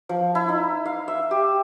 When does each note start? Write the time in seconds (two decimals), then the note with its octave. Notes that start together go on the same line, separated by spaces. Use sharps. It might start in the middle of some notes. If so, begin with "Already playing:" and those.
0.09 F3
0.35 E4
0.49 D#4
0.85 F5
1.08 E5
1.31 G4